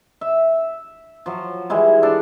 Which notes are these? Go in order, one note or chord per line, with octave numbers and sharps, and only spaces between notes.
E5
F3 F#3
E3 G3 G#3 E4
D4 A4